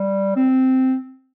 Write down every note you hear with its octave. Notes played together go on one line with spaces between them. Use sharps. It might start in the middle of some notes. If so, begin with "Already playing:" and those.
Already playing: G3
C4